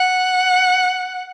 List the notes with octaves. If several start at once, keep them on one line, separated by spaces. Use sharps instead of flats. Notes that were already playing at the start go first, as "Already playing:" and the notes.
Already playing: F#5